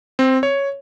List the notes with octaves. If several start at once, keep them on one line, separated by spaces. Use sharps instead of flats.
C4
C#5